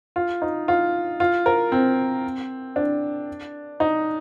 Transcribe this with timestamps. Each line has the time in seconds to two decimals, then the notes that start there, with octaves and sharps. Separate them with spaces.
0.16 F4
0.42 D#4
0.68 F4
1.20 F4
1.46 A#4
1.72 C4
2.76 D4
3.80 D#4